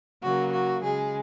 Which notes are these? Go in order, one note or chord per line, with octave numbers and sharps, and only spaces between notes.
C#3 F#3 A#3 F#4
F#4
C#3 G#3 G#4